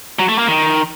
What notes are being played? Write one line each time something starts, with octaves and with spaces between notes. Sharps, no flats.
F#3
A3
A#3
D#3